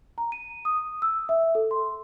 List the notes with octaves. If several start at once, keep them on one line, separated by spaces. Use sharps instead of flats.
A#5
D#7
D#6
E6
E5
A4
C6